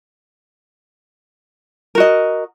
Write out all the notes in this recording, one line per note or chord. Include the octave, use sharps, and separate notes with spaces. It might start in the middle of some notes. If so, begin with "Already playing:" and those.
F#4 A#4 D#5